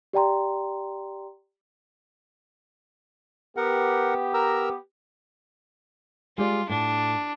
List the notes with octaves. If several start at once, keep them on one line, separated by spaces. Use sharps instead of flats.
G4 D5 G5 A#5 C6
B3 G4 A#4 F#5
A#4 A#5 E6
G#3 F4 G4 D5
A2 D4